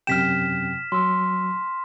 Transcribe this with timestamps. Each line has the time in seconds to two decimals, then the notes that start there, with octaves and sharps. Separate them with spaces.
0.07 F#2 C3 G5 F6 B6 E7
0.92 F#3 C6 E6